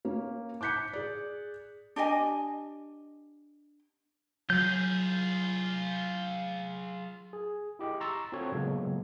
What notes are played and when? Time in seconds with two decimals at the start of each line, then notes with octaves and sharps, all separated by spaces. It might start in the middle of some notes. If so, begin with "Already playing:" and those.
0.05 A#3 C#4
0.61 D6 F#6 G6 B6 C#7
0.93 G#4 D5
1.96 D4 G4 D#5 G#5
4.50 F#3 F4 G#4 G6
7.33 G#4
7.79 E4 G4 D#5
8.00 A#5 C6 C#6 E6 A6
8.32 C4 F4 F#4 A4 C#5
8.52 A#2 C#3 F#3 G#3 A#3 B3